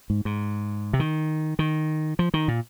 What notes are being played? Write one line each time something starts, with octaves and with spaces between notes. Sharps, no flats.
G#2
G#2
C3
D#3
D#3
F3
D#3
A#2